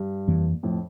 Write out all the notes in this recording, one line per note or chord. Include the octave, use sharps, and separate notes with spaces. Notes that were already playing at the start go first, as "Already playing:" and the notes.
Already playing: G2
F2 E3 A#3
F2 A2